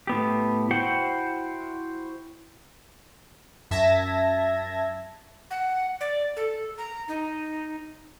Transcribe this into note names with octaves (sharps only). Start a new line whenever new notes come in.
A2 B3 G4
E4 F#4 C5 F#5 G5
F#2 E5 A5 G#6 A#6
F#5
D5
A4
A#5
D#4